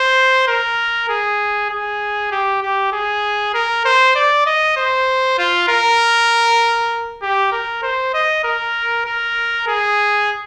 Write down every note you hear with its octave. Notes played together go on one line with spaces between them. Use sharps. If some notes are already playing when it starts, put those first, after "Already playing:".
Already playing: C5
A#4
G#4
G#4
G4
G4
G#4
A#4
C5
D5
D#5
C5
F4
A#4
G4
A#4
C5
D#5
A#4
A#4
G#4